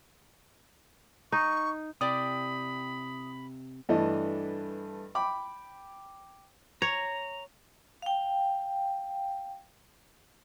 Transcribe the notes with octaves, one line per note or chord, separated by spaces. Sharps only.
D#4 C#6
C3 E4 G4 D5 B5 D#6
G2 E3 A3 D4 D#5
G5 B5 D6
C#5 A#5
F5 G5